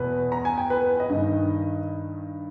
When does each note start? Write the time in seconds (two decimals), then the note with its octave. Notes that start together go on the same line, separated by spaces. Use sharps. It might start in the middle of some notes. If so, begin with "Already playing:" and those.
Already playing: E2 B2 B4
0.32 A#5
0.45 G#5
0.58 G5
0.70 B4
0.81 B4
1.00 D#5
1.09 G2 D#3